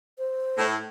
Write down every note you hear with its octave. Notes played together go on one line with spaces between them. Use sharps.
C5
A2